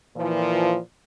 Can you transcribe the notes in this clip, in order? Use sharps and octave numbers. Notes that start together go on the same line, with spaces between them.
A#2 E3 F3